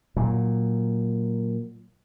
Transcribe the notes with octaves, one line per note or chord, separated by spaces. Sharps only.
A#2 F#3